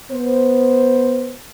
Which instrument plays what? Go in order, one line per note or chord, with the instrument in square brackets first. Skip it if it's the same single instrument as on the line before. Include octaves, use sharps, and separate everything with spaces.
[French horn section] B3 C5